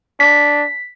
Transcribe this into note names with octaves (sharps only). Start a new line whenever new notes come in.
D4 B6